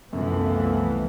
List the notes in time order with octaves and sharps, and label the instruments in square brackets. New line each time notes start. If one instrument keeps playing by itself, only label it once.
[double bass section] C2 E3 F3 [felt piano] F#2 [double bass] A3 B3